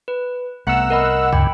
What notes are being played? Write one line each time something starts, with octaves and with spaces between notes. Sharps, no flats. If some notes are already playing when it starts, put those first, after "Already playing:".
B4
C2 A3 B3 F#5 A#5 E6
A#4 D#5 B5
D2 G2 C#3 G5 B5